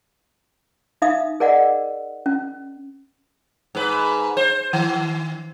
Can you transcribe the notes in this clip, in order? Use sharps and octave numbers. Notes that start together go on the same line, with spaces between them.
D#4 E5 F5 D#6
G#4 A#4 D5 D#5 F#5
C#4
G#2 B4
C5
D#3